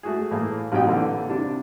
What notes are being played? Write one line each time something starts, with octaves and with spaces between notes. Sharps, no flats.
A3 F#4 G#4
A2 E3 A#3 G#4
A1 C3 F#3 D#4 G5
A#2 D3 E3
C3 D4